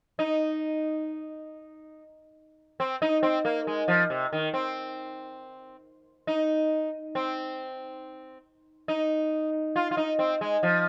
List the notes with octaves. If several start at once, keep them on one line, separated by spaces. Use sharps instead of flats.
D#4
C4
D#4
C4
A#3
G#3
F3
C3
D#3
C4
D#4
C4
D#4
F4
F4
D#4
C4
G#3
F3